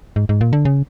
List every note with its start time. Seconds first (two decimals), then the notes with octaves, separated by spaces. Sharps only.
0.16 G#2
0.29 G#2
0.41 A#2
0.53 D3
0.65 C#3